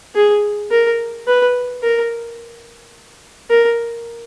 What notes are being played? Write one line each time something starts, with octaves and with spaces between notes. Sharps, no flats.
G#4
A#4
B4
A#4
A#4